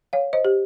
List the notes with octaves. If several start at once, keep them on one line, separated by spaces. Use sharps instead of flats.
C#5 F5
C5 D#5
G4